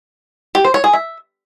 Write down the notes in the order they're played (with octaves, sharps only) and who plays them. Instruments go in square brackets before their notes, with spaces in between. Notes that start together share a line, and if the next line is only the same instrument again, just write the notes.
[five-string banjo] G4
C5
C#5
G#4
E5